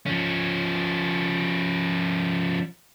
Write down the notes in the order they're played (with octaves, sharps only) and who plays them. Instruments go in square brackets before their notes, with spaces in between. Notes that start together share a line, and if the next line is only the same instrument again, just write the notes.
[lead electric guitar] F3 C#4